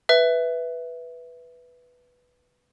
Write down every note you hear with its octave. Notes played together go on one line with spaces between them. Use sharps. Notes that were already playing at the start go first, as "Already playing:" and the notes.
B4 E5